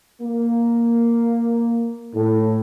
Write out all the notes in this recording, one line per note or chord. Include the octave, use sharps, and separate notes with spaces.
A#3
A2